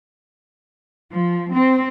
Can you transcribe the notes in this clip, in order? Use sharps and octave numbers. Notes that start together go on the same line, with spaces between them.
F3
C4